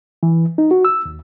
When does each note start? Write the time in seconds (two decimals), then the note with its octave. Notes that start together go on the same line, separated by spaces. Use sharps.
0.23 E3
0.58 D#4
0.71 F#4
0.85 E6
1.06 D#2